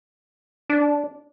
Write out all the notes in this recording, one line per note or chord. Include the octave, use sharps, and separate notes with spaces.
D4